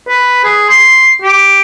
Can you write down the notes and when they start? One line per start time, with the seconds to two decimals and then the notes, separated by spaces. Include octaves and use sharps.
0.09 B4
0.44 G#4
0.70 C6
1.22 G4